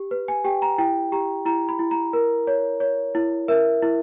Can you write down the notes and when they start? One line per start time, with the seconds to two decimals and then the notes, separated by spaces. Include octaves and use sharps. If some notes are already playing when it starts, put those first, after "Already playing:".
Already playing: G4
0.11 B4
0.28 G#5
0.45 G4 G5
0.62 A#5
0.78 E4 G5
1.12 G4 A#5
1.45 E4 A#5
1.69 B5
1.79 E4
1.91 A#5
2.13 A#4
2.47 C#5
2.80 C#5
3.15 E4
3.48 A#4 E5
3.83 E4